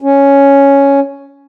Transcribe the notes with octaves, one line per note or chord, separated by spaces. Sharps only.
C#4